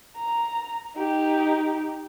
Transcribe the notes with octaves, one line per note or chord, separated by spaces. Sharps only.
A#5
D#4 G4